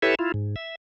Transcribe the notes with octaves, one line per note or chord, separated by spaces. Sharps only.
E4 G4 A4 B4 C#5 E5
E4 F4
G#2
E5